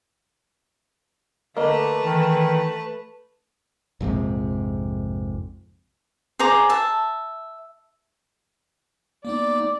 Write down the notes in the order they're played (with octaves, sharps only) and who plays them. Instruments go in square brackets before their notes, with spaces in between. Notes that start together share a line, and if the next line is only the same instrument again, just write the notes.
[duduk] D3 [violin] A3 B4 [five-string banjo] A#3 D#5
[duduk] D#3 [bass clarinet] E3
[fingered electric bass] A#1 F2 G#2 C3
[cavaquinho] G#4 C5 A#5 D6
E5 A5
[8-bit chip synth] A#3 B3 D#4 [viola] D5